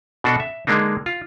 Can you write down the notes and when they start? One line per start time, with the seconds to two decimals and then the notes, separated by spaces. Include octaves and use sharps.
0.24 B2 D4 F#4 A4
0.40 E5
0.67 D3 G#3 A#3 D4 D#4
1.06 F4